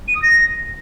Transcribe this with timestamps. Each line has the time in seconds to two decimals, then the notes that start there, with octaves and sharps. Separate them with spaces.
0.08 D#7
0.15 D#6
0.22 A#6